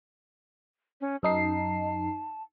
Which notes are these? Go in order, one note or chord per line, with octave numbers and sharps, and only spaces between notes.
C#4
F#2 D#4 A5 C7